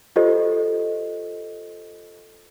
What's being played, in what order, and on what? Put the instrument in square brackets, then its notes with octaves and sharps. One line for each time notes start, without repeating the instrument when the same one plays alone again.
[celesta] F4 G4 A4 C5 D#5